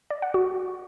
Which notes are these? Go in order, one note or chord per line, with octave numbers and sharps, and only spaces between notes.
D5
F#5
F#4